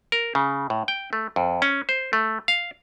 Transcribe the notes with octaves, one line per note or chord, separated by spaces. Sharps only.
A#4
C#3
A2
G5
A3
F2
C#4
C5
A3
F5